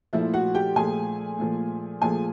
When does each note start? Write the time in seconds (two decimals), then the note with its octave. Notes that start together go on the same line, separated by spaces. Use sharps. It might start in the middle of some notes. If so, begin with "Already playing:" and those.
0.13 A#2 F3 A3 E4 E5
0.33 F#4 F#5
0.54 G4 G5
0.76 A#2 F3 A3 G#4 G#5
1.39 A#2 F3 A3
2.01 A#2 F3 A3 G#4 G#5